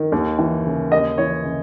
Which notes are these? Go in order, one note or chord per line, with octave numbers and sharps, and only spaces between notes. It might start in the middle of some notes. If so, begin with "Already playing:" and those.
Already playing: D#3
D#2
E3
C#3
D#2 D#5
E3 C#5
C#3